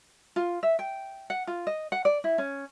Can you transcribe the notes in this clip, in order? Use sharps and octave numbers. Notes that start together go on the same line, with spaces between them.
F4
E5
G5
F#5
F4
D#5
F#5
D5
E4
C#4